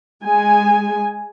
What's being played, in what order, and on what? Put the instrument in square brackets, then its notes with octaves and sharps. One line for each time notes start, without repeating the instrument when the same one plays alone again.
[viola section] G#3 G#5